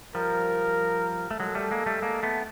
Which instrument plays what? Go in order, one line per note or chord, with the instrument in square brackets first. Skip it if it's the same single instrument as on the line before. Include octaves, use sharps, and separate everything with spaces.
[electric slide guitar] F3 G3 [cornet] A#4
[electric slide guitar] A3
[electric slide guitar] F#3 G#3 [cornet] A4
[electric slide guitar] G3 A3
G#3 A#3
G3 A3
G#3 A#3
A3 B3